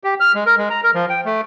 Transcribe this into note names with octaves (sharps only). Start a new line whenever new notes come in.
G4
F6
G#3
A#4
G#3
A#5
A#4
F3
G5
A3